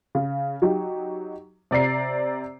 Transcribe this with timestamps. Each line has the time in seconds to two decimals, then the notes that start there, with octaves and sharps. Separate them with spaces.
0.15 C#3
0.62 F#3 D#4 G4
1.71 C3 D5 A#5 C7